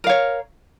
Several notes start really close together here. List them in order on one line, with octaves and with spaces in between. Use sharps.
A#4 F5 C#5